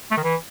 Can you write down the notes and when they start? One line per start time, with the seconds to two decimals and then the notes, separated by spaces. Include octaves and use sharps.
0.11 A3
0.17 D#3
0.23 E3